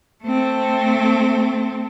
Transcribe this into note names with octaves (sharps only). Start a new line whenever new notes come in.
A3 C4